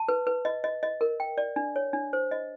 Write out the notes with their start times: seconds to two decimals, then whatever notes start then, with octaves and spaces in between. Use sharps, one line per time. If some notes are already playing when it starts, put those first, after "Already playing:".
Already playing: A5
0.09 B4
0.27 B4
0.45 D#5
0.64 D#5
0.83 D#5
1.01 A#4
1.20 G5
1.38 D5
1.56 D4
1.76 C#5
1.93 D4
2.13 C5
2.31 D#5